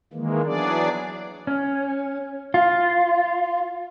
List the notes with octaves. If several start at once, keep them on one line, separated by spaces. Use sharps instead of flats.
D#3 E3 G#3 A#3
E3 F#3 B3 D4 G#4 D5
C#4
F4